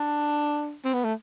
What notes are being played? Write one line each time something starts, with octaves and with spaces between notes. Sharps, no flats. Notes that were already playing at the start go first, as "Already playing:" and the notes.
Already playing: D4
C4
B3
A3